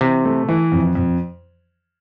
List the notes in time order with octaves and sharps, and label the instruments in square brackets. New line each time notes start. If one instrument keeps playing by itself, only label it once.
[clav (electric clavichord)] C3 [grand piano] E3
[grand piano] A3
E3
F2
F2